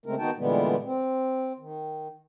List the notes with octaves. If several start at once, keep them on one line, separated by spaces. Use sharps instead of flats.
C#3 G#3 A3 C4 A#4
D#3 B3 D#4 F#4 G5 A5
A#2 D3 E3 G3 G#3 B3
C4
D#3